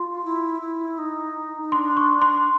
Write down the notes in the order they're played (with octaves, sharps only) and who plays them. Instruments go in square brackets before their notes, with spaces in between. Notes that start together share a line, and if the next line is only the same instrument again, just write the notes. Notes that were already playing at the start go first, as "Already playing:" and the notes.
Already playing: [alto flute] F4 [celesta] C6
[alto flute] E4
E4
D#4
D#4
[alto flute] D4 [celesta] C6
[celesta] C#6
C6